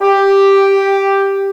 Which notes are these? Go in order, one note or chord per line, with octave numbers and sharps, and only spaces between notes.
G4